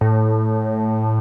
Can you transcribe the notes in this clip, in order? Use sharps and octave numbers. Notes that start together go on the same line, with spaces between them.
A2